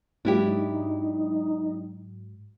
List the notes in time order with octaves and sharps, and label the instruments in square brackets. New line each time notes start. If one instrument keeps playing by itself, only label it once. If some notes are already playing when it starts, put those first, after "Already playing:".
[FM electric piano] G#2 F#3 [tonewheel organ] A#3 F4 [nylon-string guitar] D4 E4 G4
[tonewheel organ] D#4